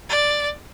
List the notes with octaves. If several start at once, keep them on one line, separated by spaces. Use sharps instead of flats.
D5